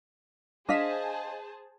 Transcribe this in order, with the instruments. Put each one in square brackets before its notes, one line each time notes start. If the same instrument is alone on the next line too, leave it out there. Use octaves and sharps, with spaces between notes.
[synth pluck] D4 B6 E7 [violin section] G#4 C5 A5 [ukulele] D#5 F5